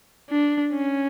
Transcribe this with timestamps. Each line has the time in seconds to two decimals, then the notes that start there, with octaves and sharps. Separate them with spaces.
0.30 D4
0.73 C#4